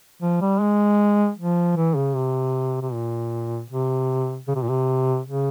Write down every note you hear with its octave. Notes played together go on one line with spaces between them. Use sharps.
F3
G3
G#3
F3
E3
C#3
C3
C3
A#2
C3
C#3
C3
A#2
C3
C#3